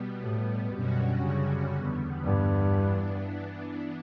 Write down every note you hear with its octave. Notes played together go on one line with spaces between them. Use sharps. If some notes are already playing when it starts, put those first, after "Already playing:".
Already playing: B2 G3 B3
A2
F#2 B2 D3 G3 C#4 F#4
C#3
E2 D3 G3 B3
G2
E3 B3 D4